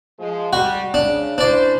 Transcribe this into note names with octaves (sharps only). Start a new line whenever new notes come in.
F3 G#3
G3 F#4
C#3 D4
C#4 D4 E4 C5 D5